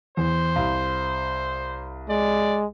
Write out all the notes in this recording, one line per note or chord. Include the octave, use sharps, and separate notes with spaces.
E2 C5
C2 F5
G#3 D5